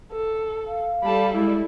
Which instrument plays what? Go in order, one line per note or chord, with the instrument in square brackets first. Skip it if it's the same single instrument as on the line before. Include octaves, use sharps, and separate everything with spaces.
[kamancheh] A4
[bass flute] F5
[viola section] G3 A4 [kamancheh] A5 B5
[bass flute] G#3 [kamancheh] E4